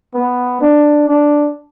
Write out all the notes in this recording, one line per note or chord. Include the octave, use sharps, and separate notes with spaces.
B3
D4
D4